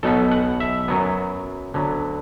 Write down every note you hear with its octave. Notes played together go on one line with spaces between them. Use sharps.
B1 B2 B3 A4
F#5
E5
F#2 F#3 B3
D2 D3 F#3 B3